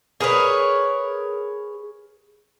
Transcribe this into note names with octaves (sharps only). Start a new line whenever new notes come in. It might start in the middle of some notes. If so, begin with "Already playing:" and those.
G#4 A#4 B4 C#5